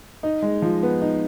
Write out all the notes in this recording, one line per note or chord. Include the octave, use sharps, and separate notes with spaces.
D#4
G#3
F3
B3
D#4